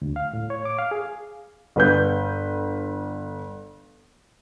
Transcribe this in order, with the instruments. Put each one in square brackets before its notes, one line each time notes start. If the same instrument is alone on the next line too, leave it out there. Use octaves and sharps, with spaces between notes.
[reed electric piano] D2
F5
A2
C#5
D6
F5
G#4
[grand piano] G1 B4 G6